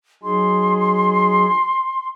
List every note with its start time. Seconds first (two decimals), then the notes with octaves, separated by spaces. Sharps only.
0.23 F#3 D#4 G#4 C6